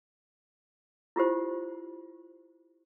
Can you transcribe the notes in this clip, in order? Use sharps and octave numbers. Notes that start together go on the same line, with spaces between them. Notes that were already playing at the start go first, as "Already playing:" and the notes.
E4 F4 G4 C5